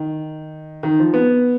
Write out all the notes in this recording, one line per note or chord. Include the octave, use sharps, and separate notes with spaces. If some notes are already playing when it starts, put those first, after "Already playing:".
Already playing: D#3
D#3
F3
B3